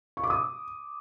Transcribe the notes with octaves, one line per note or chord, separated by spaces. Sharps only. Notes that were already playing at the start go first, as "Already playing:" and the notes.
C#6
D6
D#6